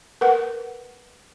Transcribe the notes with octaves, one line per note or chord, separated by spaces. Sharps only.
A#4 B4 F#5